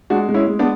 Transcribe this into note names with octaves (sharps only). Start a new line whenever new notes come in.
G#3 D4 F#4
G#3
C#4 E4
G#3
B3 D4